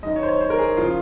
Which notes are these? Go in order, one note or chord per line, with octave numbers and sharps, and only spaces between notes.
F#2 D#3 D#5
C#5
C5
C#5
C5
A#4
G#4
C#3 F3 F4